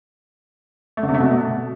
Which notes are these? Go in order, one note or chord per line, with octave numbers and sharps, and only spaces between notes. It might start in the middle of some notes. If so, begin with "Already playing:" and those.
A3
D3
C3
A3
B2